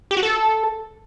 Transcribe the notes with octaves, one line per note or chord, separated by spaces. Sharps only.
G4
F#4
A4